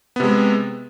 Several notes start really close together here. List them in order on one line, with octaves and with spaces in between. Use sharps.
B3 C3 G#3